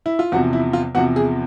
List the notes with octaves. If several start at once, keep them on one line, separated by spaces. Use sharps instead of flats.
E4
F4
E2 C3 F3 F#4
E4
F4
E2 C3 F3 F#4
G#4